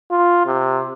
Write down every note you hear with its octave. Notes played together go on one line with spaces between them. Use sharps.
F4
C3